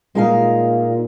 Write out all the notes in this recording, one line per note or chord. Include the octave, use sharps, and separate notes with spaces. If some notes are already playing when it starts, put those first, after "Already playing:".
A#2 G#3 D#4 F5